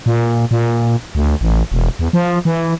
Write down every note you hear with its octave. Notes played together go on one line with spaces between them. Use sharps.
A#2
A#2
D2
A1
E1
E2
F3
E3